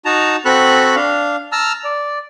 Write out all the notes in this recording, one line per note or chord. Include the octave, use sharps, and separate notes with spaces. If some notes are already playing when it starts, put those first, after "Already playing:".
D#4 F#4 A5 A#5
C4 F#4 A4 B5 C#6 F#6
D4 F5
A5 A#5 E6 F6
D5